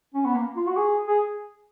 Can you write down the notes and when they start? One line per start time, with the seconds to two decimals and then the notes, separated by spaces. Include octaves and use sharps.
0.14 C#4
0.25 B3
0.35 A#3
0.56 F4
0.67 F#4
0.77 G#4
1.08 G#4